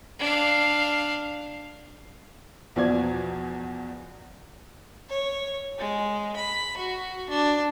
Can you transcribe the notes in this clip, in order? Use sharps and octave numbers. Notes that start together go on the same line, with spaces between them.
D4 F5
E2 B2 F3 D5 G#6
C#5
G#3
B5
F#4
D4